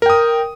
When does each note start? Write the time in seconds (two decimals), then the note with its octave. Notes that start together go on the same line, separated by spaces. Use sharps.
0.02 A#4
0.06 G5
0.10 D#6